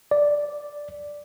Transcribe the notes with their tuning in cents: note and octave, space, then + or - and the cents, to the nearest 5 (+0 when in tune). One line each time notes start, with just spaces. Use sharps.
D5 +0